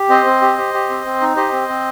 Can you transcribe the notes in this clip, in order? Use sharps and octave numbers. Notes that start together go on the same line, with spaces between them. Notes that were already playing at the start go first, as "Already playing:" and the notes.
Already playing: G4
C4 C5 D#5
C4
G4
G4
G4
C4
C4
D#4
G4 C5 D#5
C4
C4